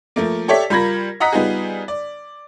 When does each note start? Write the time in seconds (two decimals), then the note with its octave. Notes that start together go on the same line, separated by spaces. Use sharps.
0.16 F3 A3 A#3
0.48 G4 A4 C#5 D5 E5 B6
0.70 G3 F4 A#4 B5 G#6 A#6
1.20 D#5 F#5 A#5 D#6 B6
1.33 G3 B3 D#4 F4 G#4
1.88 D5